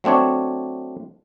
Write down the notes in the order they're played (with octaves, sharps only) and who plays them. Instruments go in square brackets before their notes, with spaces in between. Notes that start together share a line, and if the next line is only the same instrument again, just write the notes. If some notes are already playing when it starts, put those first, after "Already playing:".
[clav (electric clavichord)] F#3 A3 C4 D4 C#5